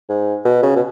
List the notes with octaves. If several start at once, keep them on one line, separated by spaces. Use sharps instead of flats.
G#2
B2
C#3
B2